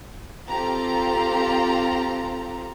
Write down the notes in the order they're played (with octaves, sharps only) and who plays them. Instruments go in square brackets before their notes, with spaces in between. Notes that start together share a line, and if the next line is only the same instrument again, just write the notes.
[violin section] C4 F4 G4 A4 A#5